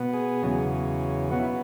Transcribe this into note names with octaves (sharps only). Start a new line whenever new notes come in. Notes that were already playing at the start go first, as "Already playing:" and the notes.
Already playing: B2 B3
G#4
E2 C#3 F#3
B2 F#3 B3 F#4
E4